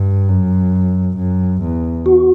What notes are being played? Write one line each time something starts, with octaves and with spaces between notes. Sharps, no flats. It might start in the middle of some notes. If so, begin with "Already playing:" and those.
Already playing: G2
F#2
F#2
E2
F#4